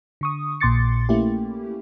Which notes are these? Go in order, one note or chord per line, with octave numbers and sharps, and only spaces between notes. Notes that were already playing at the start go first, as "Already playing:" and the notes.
D3 C#6 D#6
A#1 A#2 C6 D6 A6 C#7
A3 A#3 C#4 E4 G4